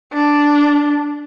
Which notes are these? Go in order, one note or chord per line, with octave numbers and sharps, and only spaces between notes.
D4